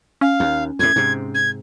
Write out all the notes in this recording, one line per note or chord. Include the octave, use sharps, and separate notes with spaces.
C#4 F5
D#2
E2 A2 G#6
G#2 C3
G#6